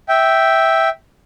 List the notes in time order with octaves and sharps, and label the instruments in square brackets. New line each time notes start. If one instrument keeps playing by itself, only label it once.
[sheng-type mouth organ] E5 G5